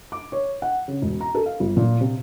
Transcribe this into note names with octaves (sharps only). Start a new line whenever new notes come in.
D6
C#5
F#5
C#3
E1
A#5
A4
F5
G1
A#2
C3